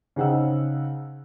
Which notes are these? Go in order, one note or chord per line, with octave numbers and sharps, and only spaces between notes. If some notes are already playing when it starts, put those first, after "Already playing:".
C#3 D#4 C5 F#5 G5 E6